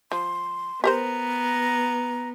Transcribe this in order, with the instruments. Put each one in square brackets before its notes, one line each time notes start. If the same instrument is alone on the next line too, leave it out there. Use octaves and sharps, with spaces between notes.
[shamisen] F3 [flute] C6
[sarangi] B3 [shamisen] G4 A#4 C5 [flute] A#5